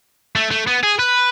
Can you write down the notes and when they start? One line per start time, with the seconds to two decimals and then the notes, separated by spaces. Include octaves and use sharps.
0.36 A3
0.51 A3
0.67 B3
0.83 G#4
0.99 B4